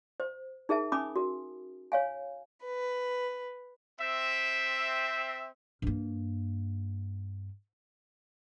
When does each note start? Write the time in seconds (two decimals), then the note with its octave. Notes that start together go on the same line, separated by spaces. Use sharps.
0.20 C5
0.69 D#4 G#4 A#4 E5 A5
0.92 C#4 G#5 B5 D6 D#6
1.16 F#4 A#4
1.92 C#5 F5 G#5
2.65 B4
4.00 C4 E5
5.82 G2 A#3